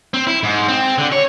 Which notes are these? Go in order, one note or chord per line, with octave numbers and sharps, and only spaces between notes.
C4
E4
G#2
C4
D3
C#5